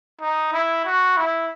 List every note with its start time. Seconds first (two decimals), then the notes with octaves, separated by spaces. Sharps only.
0.21 D#4
0.53 E4
0.85 F#4
1.17 E4